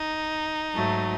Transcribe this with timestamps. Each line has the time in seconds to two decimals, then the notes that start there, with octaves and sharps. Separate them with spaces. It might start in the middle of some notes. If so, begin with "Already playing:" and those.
Already playing: D#4
0.73 G#2 F#3 A3